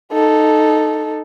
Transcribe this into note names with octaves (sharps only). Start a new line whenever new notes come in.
D#4 A4